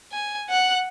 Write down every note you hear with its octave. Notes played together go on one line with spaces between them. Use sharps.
G#5
F#5 F#6